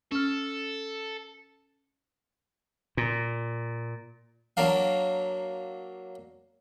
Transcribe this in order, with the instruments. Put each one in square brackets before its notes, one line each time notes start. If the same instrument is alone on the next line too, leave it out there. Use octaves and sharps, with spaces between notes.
[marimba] C#4 F6 [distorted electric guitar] A4
[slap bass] A#2
[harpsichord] F#3 A#3 D4 F5